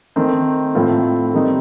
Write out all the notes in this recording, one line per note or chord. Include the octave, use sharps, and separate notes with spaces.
D#3 A3 C4 D#4
A2 A3 C4 F4
D#3 G3 C4 D#4